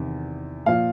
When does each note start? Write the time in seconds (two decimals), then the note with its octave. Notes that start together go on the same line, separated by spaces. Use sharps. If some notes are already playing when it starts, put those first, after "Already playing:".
Already playing: E2 C3 D#3
0.66 A#2 F3 F5